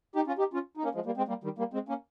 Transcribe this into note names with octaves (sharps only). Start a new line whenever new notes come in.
D#4 G4
C#4 F4
D#4 G4
C#4 F4
D#4
A#3 C#4
F3 G#3
G3 A#3
G#3 C4
G3 A#3
D#3 G3
G3 A#3
G#3 C4
A#3 C#4